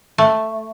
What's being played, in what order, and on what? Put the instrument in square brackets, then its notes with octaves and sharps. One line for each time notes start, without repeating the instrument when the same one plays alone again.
[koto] A3